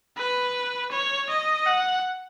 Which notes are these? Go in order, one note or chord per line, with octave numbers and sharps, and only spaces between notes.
B4
C#5
D#5
F#5